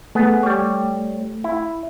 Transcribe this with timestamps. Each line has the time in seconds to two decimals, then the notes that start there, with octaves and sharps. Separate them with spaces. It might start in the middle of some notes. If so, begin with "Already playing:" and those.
0.15 A3 B3 G#4
0.43 G3 C#5
1.44 E4